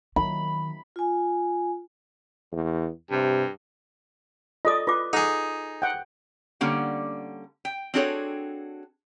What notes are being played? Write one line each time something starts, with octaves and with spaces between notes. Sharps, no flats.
D#3 F#3 B5
F4 G#5
E2
G2 C3
F4 A4 D5 D#5 D#6
F4 B4 D6
D#4 G#4 A4 F#5
F#5 G5
D3 G3 A#3 C#4 F#5
G5
C4 D4 F#4 G#4 A4 C#5